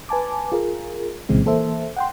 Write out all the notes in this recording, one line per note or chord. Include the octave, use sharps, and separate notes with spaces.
B4 G#5 A5 D6
F4 G#4 A#4
C2 A#2 C#3 E3 G#3 C4
E3 A#3 A4 C5 E5
F#5 G5 C6